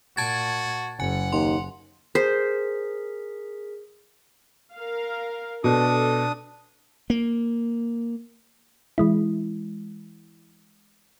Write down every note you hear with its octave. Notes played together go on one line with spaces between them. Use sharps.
A#2 F#4 A5 G#6 A6
F#1 F#5 G#5
D#2 C6
G#4 A#4 C5 B6
A#4 F5
B2 D4 A4 D#6
A#3
E3 G#3 E4